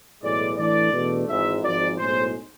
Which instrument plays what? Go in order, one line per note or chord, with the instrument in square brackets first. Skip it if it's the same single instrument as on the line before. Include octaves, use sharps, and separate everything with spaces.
[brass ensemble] B1 A2 E3 G#3 D5
A2 E3 A3 D4 D5
E2 B2 A3 D4
G#1 G#2 E3 E5
G#1 G#2 F3 D5
B1 A2 G#3 C5